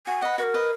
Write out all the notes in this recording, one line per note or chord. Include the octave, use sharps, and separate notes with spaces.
F#4 G#5
B4 D#5 F#5
F#4 B4
A#4
B4 D#5